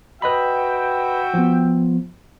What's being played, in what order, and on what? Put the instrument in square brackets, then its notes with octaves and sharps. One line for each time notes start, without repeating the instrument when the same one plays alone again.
[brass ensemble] F#4 E5 G5 [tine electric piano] B4 D#5 B5
[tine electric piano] F3 B3